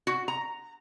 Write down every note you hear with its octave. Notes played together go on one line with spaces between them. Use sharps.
F#4
A#5